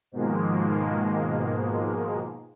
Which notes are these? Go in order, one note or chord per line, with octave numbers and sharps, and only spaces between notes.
G#2 B2 D#3 F3 G#3 A#3